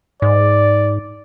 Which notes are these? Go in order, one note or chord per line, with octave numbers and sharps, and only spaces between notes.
G#2 D5